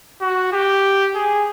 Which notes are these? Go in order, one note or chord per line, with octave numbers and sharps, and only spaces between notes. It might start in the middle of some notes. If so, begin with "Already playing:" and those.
F#4
G4
G#4